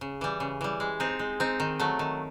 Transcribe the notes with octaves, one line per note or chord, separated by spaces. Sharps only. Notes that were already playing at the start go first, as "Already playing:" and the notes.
C#3
E3 G3
C#3
E3 G3
G#3
C4 D#4
G#3
C4 D#4
D#3
F#3 A3
D#3